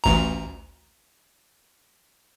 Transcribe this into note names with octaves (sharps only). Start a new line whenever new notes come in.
A1 D2 A#5